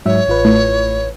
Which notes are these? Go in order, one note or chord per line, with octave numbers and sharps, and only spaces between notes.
G#2 F#3 C#5 E5
A1 F4 B4
A2